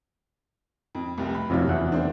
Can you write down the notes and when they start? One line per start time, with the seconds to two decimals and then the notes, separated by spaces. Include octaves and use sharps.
0.95 F2
1.18 F1 C2
1.35 B5
1.50 F2 C3 F#3 F4
1.68 E2 F#5
1.92 A#3 C4 D4